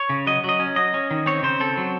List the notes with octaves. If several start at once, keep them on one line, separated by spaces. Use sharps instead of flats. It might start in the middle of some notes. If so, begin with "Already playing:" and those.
Already playing: C#5
C#3
F#3 D#5
F#3 D#5
C#4
F#3 D#5
C#4
D#3
C4 C#5
C#3 C5
C4 A4
F#3